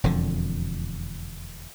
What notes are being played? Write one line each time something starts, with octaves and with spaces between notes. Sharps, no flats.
E1 F2 D3